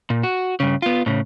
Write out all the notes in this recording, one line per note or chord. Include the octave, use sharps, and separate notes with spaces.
A#2
F#4
G2 C#3
B3 F4
A2 C#3